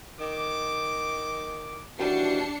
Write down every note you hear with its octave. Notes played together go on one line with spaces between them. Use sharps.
D#3 D6
D#2 E3 G3 D4 F#4 C7 C#7